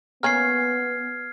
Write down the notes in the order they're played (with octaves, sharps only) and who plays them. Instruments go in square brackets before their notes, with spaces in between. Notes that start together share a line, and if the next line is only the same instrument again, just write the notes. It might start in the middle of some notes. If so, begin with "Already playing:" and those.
[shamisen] A#3 C#4 [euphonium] B3 [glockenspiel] F6 G#6 C7